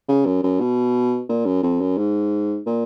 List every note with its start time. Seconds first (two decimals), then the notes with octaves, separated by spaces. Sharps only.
0.09 C#3
0.26 F#2
0.43 F#2
0.60 B2
1.29 A#2
1.46 F#2
1.63 F2
1.81 F#2
1.98 G#2
2.66 A#2